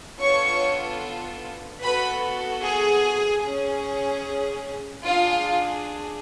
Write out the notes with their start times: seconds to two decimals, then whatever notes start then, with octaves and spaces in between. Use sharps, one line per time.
0.20 B3 D4 F4 A4 C#5 C#6
1.82 B3 F#4 A4 B4 B5
2.63 G#4 G#5
3.43 C#4 G#4
5.05 D4 F4 G#4 F5